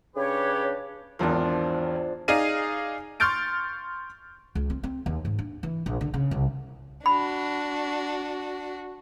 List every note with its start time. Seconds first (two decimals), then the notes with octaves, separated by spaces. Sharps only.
0.16 C#3 D4 G4 B4 C#5
1.19 G#1 E2 F3 D4 A#4
2.28 D#4 G#4 D5 F5 D#7
3.20 C6 C#6 F6 G6 A6 D7
4.55 C#2
4.70 C4
4.83 C4
5.06 D#2
5.25 G#2
5.39 D4
5.63 E3
5.86 A#1
6.01 D3
6.14 C#3
6.31 C2
7.06 D4 F#4 B5